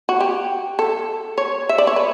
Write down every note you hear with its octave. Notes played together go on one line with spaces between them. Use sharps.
F#4
G4
A4
C#5
E5
D5
C#5
B4